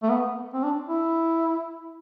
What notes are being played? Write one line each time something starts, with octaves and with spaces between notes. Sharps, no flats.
A3
B3
C4
D4
E4